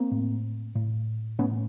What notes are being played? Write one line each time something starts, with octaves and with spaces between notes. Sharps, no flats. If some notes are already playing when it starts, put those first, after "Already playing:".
Already playing: A#3 C4
A2
A2
A2 B3 C#4